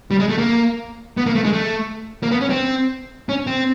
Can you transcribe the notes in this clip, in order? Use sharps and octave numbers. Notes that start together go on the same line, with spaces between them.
G3
G#3
A3
A#3
B3
A#3
A3
G#3
A3
A#3
B3
C#4
C4
C#4
C4